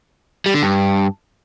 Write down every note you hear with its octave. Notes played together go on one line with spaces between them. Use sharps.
G3
D3
G2